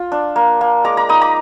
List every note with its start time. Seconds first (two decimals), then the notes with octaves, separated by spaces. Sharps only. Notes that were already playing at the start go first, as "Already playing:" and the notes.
Already playing: F4
0.12 D4
0.36 A#3
0.61 A#3
0.84 G#3 A#5 D6
0.97 A#5 D6
1.09 D#4 B5 D#6
1.21 A#5 D6